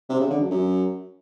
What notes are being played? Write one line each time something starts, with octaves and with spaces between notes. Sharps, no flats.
C3
C#3
D3
F#2
F#2